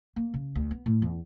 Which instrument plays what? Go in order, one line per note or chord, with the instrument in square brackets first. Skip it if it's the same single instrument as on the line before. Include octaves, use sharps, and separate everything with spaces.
[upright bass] A#3
C#3
D2
B3
A2
E2